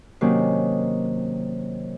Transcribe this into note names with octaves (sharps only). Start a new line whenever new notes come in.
C3 D#3 F#3 A#3 C#4